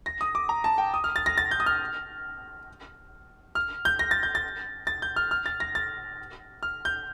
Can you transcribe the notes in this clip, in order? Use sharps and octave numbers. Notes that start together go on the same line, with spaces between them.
A#6
D#6
D6
A#5
A5
G5
D#6
F6
A6
A#6
A6
G6
D#6
F6
F6
G6
A#6
A6
G6
A6
A6
G6
F6
F6
A6
A#6
A6
F6
G6